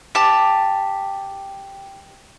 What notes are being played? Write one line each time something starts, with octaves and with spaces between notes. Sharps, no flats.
G4 A5